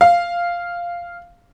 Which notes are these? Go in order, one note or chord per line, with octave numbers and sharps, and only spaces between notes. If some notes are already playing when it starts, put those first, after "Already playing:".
F5